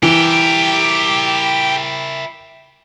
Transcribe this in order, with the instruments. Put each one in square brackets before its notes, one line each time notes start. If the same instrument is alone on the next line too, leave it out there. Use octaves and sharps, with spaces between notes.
[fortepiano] E3 [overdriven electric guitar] E4 A#4 [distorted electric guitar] G4